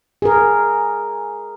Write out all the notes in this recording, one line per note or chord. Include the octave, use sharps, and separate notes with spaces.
G#4 A#4